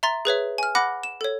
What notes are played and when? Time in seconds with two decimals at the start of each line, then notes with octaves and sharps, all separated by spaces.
0.03 E5 A#5 C6 A6
0.25 G#4 B4 C#5 E5
0.58 G#5 F6
0.75 F#5 B5 D6 F#6 A#6
1.03 E7
1.21 A4 C#5